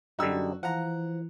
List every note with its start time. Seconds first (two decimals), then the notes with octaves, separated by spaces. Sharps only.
0.19 F#2 D3 G3 D#4 F#4 E6
0.63 E3 F3 F#5 A#5